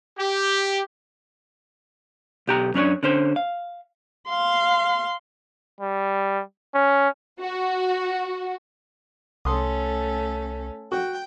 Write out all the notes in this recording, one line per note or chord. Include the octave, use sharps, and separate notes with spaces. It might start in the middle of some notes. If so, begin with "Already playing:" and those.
G4
B1 G4 A#5
F#2 C#4 D4 C#5
D3 C#4 C5
F5
F5 C6
G3
C#4
F#4
C2 A3 C#4 A4 C6 D#6
F#4 G5